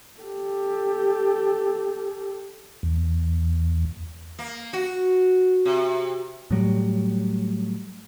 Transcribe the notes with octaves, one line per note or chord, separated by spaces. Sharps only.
G4 A4
E2
A#3
F#4
C3
A2 F#3 G3